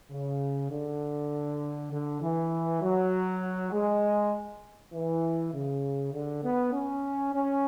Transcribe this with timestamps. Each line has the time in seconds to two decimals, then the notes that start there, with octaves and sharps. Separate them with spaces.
0.11 C#3
0.70 D3
1.91 D3
2.21 E3
2.81 F#3
3.72 G#3
4.93 E3
5.53 C#3
6.13 D3
6.43 B3
6.73 C#4
7.33 C#4